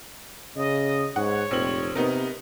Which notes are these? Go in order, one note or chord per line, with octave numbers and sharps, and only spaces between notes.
C#3 D#5
G#2 C#5 F#5
F1 A#1 C4 F#7
C3 B3 D#4 A#4